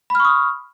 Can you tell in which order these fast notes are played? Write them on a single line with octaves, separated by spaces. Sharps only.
B5 F6 C#6 D#6